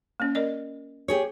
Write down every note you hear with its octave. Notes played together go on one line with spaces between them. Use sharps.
A#3 C#4
A#4 D5 D#5
G4 G#4 C#5